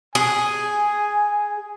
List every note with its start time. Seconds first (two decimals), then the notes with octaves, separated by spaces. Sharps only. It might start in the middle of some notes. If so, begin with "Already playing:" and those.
0.15 G#4 G#5